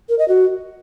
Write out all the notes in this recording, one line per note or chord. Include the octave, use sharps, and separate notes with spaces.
A#4
D#5
F#4